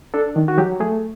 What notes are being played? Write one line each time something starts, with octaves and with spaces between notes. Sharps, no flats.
D4 A4
D#3
F#4
F#3 G4
A3 G#4